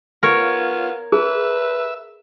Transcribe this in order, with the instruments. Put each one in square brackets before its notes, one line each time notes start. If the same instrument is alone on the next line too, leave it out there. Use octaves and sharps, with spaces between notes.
[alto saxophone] B3 [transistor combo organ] F4 [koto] A#4 C#5
[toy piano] G#4 [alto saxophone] B4 [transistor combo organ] E5